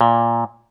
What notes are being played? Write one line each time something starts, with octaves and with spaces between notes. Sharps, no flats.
A#2